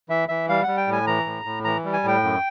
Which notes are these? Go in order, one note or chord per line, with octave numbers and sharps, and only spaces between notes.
E3 E5
E3 E5
G3 F5
G3 F#5
G5
A2
G#5
E3 A#5
A2
A2
E3 A#5
G3
G#5
A2 G5
F#2